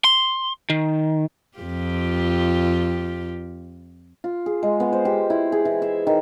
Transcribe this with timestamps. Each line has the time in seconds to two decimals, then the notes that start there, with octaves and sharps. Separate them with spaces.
0.04 C6
0.70 D#3
1.58 F2 F4 G4
4.24 F4
4.46 G#4
4.63 G#3
4.80 B3
4.93 C5
5.05 G4
5.30 E4
5.52 G#4
5.65 E3
5.82 E5
6.07 D#3